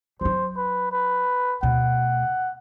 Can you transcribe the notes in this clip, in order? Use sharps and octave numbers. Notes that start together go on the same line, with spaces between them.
F#3 D4 C5
B4
B4
D2 B2 F#5